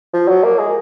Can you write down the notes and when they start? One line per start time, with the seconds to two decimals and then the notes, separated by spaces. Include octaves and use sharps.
0.13 F3
0.28 F#3
0.43 A#3
0.58 G#3